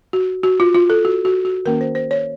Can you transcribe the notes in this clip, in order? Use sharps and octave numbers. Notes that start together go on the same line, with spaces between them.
F#4
F#4
F4
F4
A4
F#4
F#4
F#4
D#3 A#3 C#4 A#4
C5
C5
C#5